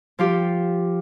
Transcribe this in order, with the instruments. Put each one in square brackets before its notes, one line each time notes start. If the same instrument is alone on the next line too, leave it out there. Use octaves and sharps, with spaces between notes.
[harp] F3 F4 G4